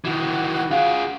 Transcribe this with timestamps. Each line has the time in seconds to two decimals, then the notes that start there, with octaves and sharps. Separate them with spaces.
0.05 D#3 E3 F#4
0.71 F4 G#4 F5 F#5